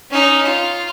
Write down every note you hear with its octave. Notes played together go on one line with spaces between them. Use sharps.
C#4 D#4
F4